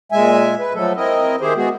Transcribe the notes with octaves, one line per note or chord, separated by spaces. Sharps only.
A#2 G#3 E5 G#5
B4
F3 F#3 A3 A4
C4 E4 A#4 D#5
D#3 E4 G4 G#4 C5
G#3 B3 F#4 G#4